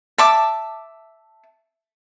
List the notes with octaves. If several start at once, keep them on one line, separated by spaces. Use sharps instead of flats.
E5 A5 D6